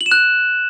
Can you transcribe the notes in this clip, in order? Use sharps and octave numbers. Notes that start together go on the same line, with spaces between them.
F#7
E7
F#6